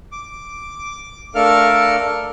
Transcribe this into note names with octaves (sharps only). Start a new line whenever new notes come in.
D6
A3 D4 A4 A#4 F5 F6